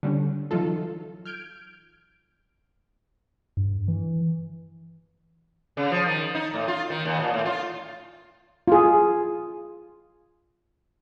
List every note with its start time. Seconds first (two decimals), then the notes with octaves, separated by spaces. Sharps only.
0.03 D3 G3 C#4 D4
0.51 E3 F#3 D#4 F4 A4
1.25 F6 G6 G#6 D7
3.57 G2
3.88 E3
5.77 C#3
5.92 F3
6.06 D#3
6.35 D#4
6.54 A2
6.68 F4
6.90 D#3
7.05 D#2
7.20 A#2
7.33 A2
7.45 F4
8.68 F4 G#4